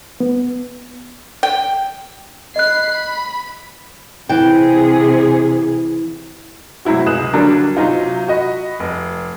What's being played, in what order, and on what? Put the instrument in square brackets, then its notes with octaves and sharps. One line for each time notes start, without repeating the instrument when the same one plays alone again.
[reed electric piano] B3
[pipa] G5
[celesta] D#5 F#6 [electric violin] B5 C7
[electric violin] B5
[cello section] C3 G#4 [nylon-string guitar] E3 G5
[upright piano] A2 C3 F#3 E4 F#4
C#2 G#4 D#6 F#6 E7
D3 F#3 G3 A#3 D4
C3 F#3 D#4 F4
F#4 D#5 B5
F1